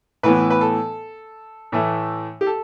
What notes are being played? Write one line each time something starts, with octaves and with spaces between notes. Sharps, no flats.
A2 E3 B3 B4
B4
A4
A2 E3 A3
G4
A4